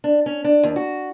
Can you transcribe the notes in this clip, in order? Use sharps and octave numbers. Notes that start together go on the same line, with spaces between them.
D4
C#4
D4
D#2
F#4